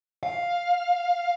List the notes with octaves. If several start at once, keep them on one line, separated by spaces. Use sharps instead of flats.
F5